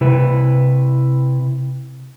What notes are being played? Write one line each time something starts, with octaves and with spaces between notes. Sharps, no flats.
C3 E4 B4